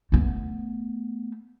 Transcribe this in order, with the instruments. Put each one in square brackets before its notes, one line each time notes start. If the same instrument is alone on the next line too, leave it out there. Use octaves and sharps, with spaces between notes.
[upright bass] A3 B3